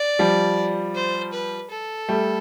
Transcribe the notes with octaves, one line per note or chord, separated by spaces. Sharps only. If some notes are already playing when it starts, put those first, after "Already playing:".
Already playing: D5
F3 G3
C5
B4
A4
G3 A3